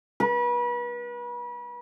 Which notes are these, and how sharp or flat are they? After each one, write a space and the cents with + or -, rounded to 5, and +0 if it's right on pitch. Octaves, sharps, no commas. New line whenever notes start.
B4 -35